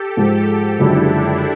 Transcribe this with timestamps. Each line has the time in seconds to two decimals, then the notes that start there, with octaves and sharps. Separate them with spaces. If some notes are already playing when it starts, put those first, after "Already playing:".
Already playing: G4 A4
0.17 G#2 F3 G#3
0.79 F#1 F#2 D3 F3 G#3 D4 E4